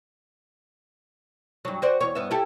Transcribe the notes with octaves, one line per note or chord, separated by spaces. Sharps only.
G2 F#3
F#4 C5 D5
E2 C#5
G2 B3 E5
E4 G4 A4